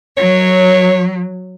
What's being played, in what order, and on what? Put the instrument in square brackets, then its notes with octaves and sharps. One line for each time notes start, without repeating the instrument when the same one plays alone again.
[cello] F#3 [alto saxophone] C#5